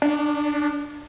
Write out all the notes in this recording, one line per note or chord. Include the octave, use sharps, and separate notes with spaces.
D4